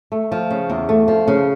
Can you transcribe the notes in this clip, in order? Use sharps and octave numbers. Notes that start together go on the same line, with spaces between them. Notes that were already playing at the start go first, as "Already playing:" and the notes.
A3
F3
C#3
E2
A3
F3
C#3